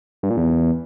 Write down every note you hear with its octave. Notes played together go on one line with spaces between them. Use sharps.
G2
A#2
E2